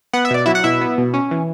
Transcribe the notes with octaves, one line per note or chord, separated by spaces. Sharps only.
B3 F#5
E5
B2 D5
F#3 E4 E5
F#5
B2 E4 E5
B3
B2
C#4
E3